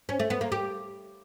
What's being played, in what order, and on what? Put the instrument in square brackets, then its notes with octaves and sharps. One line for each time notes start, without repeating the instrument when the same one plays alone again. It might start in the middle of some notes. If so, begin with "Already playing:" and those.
[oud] C#4
A3
B3
A#3
G4